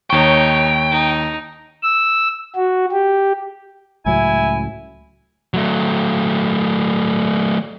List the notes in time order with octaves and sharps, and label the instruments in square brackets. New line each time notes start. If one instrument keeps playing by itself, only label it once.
[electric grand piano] D#2 C#6 [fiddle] D#4 C#5 [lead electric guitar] G5
[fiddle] D#4
[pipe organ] E6
F#4
G4
[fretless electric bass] C#2 A2 F#3 [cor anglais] E4 [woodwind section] G#5
[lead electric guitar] F#3 A3